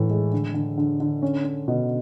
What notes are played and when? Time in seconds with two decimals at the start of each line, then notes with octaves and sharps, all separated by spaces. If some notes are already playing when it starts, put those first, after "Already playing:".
Already playing: A2 E3
0.10 G#3
0.33 D3
0.54 D3
0.77 D3
1.00 D3
1.22 C#4
1.44 C#4
1.68 B2